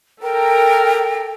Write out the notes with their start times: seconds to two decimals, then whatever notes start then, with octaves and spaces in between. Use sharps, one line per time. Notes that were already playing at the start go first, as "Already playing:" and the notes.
0.23 A4 A#4 G5